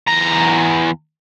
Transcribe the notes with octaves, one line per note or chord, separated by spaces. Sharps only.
E2 A#5